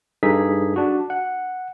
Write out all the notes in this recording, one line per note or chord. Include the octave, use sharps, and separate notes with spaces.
G2 D#4 G#4 A4 B6
D4 F#4
F#5